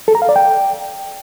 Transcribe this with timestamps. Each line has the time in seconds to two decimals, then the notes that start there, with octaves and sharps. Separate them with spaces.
0.08 A4
0.15 A#5
0.22 F5
0.29 D5
0.36 G5